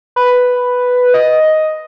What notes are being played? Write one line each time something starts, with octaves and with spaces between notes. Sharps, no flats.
B4
D#5